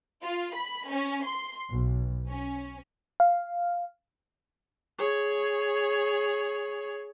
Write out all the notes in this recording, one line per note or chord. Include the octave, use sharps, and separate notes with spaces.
F4
B5
C#4
C6
B1
C#4
F5
G#4 C#5